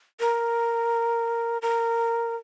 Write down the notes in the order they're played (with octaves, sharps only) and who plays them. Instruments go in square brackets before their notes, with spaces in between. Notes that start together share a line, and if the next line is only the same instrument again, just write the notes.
[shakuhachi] A#4
A#4